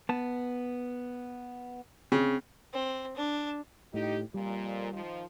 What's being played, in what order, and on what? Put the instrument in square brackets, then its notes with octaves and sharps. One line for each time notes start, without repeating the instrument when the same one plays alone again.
[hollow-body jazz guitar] B3 A5
[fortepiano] C#3 [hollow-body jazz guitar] C4
[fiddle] C4
D4
[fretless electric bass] A2 [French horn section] D#4 G4
[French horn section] F2 A#2 [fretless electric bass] G3
[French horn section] D#3 F3